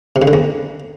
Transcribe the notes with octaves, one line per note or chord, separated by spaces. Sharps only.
C3
C#3
D3
E2